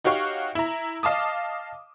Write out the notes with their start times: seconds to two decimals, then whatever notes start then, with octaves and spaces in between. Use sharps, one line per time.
0.04 D#4 F#4 G4 C#5 F5 C#6
0.55 E4 A#5
1.03 D#5 F5 A5 D6 D#6